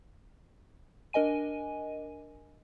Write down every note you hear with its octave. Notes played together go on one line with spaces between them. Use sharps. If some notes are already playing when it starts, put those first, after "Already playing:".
D4 A#4 D#5 G#5 D#7